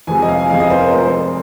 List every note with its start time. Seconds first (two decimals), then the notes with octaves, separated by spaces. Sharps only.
0.07 F2 C3 G#3 G#5
0.22 D#5
0.29 F5
0.38 G#5
0.50 F2 C3 G#3 F5
0.60 D#5
0.70 C5
0.80 A#4
0.91 F1 F2 F3 C4 C5